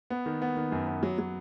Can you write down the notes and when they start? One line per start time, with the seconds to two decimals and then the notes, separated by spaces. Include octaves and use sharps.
0.10 B3
0.26 D#3
0.42 B3
0.57 D#3
0.72 F#2
0.87 B3
1.03 F#3
1.18 F#3